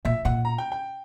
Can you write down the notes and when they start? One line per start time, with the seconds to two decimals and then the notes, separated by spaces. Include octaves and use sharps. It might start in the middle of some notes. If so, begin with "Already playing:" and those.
0.05 A#2 E5
0.25 A#2 F#5
0.45 A#5
0.58 G5
0.72 G5